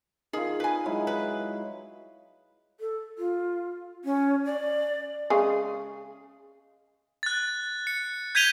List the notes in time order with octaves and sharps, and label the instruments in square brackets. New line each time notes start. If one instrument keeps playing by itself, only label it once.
[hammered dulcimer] D#3 F4 [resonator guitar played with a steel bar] G#4
[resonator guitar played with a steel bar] B4 G#5
[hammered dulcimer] F#3 G#3 E4
[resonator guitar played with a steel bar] B4
[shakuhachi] A4
F4
C#4
D5
[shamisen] C#3 G#3 G#4
[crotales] F#6 A6
C#7
G6 G#6 B6 D#7 F7 G7